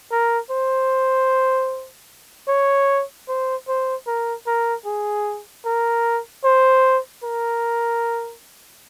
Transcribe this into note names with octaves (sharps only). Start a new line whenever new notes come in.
A#4
C5
C#5
C5
C5
A#4
A#4
G#4
A#4
C5
A#4